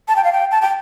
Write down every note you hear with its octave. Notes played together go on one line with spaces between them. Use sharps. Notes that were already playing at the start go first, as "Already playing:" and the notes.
A5
G5
F5
G5
A5
G5